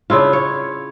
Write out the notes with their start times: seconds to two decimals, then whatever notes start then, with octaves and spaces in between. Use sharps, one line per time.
0.10 C#3 D4 E4 F4
0.33 C#5